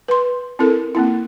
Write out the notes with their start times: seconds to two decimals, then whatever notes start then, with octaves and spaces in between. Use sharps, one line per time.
0.08 B4 C6
0.59 C4 E4 A4 A#4
0.95 A#3 C4 E4